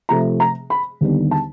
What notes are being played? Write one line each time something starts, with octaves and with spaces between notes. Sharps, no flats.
C3 F3 A3 A#5
A#5
B5
D#2 D3 G3 B3 D#4
A5